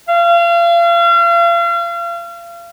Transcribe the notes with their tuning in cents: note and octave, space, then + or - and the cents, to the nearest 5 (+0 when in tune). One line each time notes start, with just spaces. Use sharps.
F5 -35